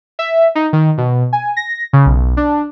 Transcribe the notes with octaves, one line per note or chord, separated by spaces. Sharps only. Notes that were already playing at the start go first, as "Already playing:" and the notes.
E5
D#4
D#3
B2
G#5
A#6
C#3
B1
D4